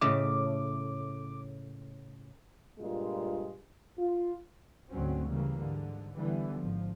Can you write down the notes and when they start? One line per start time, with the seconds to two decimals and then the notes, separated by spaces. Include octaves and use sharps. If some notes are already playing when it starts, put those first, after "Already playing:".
0.01 A2 C#3 A3 D6
2.79 G2 A#2 G#3 F4
3.98 F4
4.90 D2 G#2 D3 F#3 C4 C#4
5.26 C#3 E3 G3 A#3
5.57 G#2 D3
6.13 D3 E3 G3 B3
6.59 G#1 F3